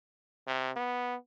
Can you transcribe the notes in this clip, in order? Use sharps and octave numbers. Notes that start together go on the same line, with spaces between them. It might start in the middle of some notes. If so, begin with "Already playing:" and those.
C3
B3